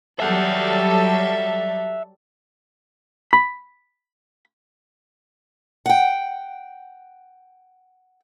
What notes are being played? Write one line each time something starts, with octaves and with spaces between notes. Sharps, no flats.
F#3 G3 A4 E5 F#5
B5
F#5 G5